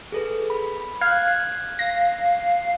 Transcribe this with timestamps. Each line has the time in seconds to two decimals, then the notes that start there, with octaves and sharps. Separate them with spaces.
0.12 G#4 A4 B4
0.50 B5
1.01 F5 F#6 G#6
1.79 F5 A#6